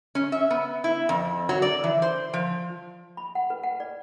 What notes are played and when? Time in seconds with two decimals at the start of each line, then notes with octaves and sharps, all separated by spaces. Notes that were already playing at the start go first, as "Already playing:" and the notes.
0.15 C#4
0.32 E5
0.50 B3
0.84 E4
1.09 F2
1.49 F#3
1.62 D5
1.84 E3
2.02 C5
2.34 F3
3.17 B5
3.35 F#5
3.50 B4
3.63 F#5
3.80 D5